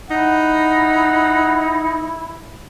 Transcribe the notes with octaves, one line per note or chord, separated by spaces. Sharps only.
D#4 E4 F#5